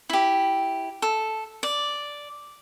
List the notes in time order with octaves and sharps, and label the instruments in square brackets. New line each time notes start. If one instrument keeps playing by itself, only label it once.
[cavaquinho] E4 G4
A4
D5